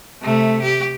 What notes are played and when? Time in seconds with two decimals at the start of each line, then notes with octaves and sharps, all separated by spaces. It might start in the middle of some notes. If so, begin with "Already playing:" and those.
0.22 C3 A3
0.62 G4